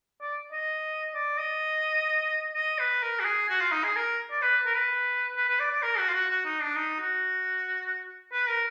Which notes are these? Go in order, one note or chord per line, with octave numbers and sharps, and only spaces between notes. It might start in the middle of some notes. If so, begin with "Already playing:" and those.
D5
D#5
D5
D#5
D#5
B4
A#4
F#4
G#4
F#4
F4
D#4
G#4
A#4
D5
B4
A#4
B4
B4
B4
D5
D5
A#4
F#4
F4
F#4
F#4
D#4
D4
D#4
F#4
B4
A#4